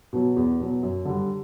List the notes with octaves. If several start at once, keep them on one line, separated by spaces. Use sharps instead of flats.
B2 F#3
E2
B2 F#3
F#2
D3 G3